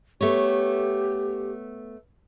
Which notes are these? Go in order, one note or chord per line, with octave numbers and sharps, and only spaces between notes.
A3 B3 G4 C#5